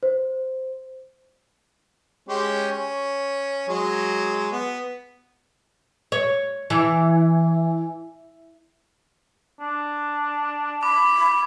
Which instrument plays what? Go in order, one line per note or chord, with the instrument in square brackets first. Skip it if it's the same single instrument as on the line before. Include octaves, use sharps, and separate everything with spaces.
[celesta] C5
[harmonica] G#3 C#4 G4
C#4
F#3 G#3 D#5
B3
[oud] C#5
E3
[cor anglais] D4
[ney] B5 [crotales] D6